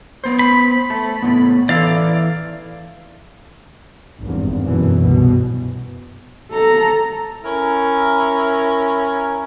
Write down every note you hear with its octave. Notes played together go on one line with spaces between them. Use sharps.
B3 C5
B5
A3 A5
A2 B3
E3 E4 A4 D5 F5
G#1 E2 G2
F#2 B2 E3
C2 G2 B2
A4 A#5
C#4 E4 A#4